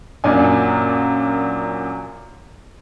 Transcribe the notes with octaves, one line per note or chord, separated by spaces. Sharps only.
F#2 A#2 D4 G#5